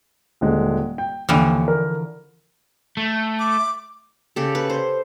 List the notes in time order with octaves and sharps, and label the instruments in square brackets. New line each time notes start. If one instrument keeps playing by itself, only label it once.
[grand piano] D#1 D3 G#3
G5
[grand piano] D#2 [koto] D3 E3 F3
[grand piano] A#4
[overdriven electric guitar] A3
[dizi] D6
[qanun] C#3 G4 A4
B4
C5